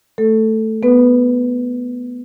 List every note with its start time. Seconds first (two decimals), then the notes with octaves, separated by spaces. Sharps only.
0.18 A3 A4
0.83 B3 B4